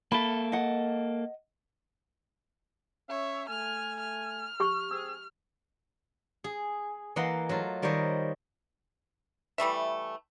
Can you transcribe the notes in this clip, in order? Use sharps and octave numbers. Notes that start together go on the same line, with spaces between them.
A#3 A4 E5 B5
D#5 F#5
C#4 C#5 E5
A3 G#5 F6
F6
G4 C#6
C4 G#4 E6
G#4
E3 A#3 D#5 F#5 C6
F#3 A3 F4
D#3 G3 A#4 C5 C#5 D#5
E3 G3 A3 E5